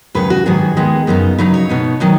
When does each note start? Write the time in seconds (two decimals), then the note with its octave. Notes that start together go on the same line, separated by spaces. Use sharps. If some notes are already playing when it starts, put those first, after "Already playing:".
0.15 D#2 C#3 F#3 B4
0.30 F#4
0.45 G#2 D#3 F#3 B3 G#4
0.76 D#2 D#3 G#3 B3 D#4
1.07 F#2 C#3 B3 D#4
1.38 C#3 F#3 D#4 B4
1.54 C#5
1.69 B2 B3 D#4
2.00 D#3 F#3 D#4